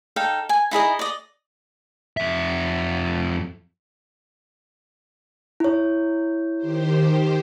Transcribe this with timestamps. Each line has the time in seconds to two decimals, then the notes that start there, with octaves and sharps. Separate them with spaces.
0.16 D#4 A4 F5 G5
0.49 G#5
0.71 D#4 E4 G#4 D#5
0.99 D5 D#5
2.17 F2 E5
5.60 E4 C#5
6.57 D#3 G4 C5